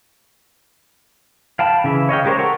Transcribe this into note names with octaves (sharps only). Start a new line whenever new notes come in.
F5 G5 A5 B5
C#3 E3 E5
C#5 D#5 F5 G5
G#3 G4 A#4 C5 C#5
A4 F#5 G5 A#5 C#6